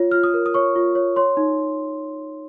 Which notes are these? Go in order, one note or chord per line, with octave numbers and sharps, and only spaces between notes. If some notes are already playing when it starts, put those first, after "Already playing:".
Already playing: F4 C#5
F4 F6
D#6
A#4
D#6
C#5 C#6
F4
C#5
C#5 C6
D#4